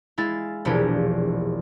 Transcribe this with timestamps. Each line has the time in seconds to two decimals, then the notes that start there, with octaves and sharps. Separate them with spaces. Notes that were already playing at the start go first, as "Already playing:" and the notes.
0.18 G#3 E4 F5 A6
0.65 E1 A#1 F3 E4 G4 G#6